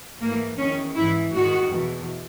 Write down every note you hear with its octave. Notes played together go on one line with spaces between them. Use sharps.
G#2 E3 A#3
E2 D#3 C#4
G#2 E3 E4
G#2 D#3 F#4
E2 B2